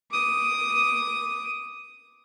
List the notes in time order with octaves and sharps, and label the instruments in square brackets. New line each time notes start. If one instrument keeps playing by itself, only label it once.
[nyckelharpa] D6 D#6